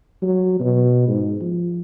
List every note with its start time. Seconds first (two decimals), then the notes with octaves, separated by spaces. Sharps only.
0.22 F#3
0.60 B2
1.08 G#2
1.41 F3